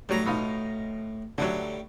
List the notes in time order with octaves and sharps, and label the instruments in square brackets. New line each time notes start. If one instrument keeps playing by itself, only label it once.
[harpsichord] A2 A#5 [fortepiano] F#3 G3
[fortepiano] B2 D#4 F4
[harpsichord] A2 G3 [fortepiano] D3 F#3